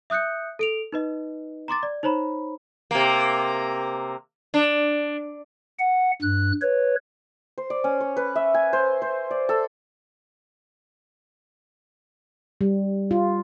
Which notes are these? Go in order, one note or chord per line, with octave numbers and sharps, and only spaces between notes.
E5 D#6 F#6 G6 C#7
A4 D7 F7
D#4 B4 D#5
A#5 C6 D6 A6
D5
D#4 C5 C#5 A#5 B5
C3 A#3
D4
F#5
G2 F#6
B4 C#5
C5
D5
C#4
C#5
B4
E5
G#5
C5
C5
D5
A4
G3
F4